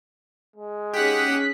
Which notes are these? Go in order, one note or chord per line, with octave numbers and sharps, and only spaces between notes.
G#3
C#4 D#4 G4 G#4 F#5 F#6 B6